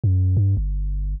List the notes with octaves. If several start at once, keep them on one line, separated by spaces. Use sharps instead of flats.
F#2
G2
G1